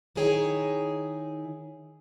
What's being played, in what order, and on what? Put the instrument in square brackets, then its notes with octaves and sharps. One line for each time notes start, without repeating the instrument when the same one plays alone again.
[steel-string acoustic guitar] D#3 D#4 E4 G#4 C#5 G5